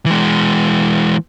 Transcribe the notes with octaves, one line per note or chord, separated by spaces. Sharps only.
E3 G#3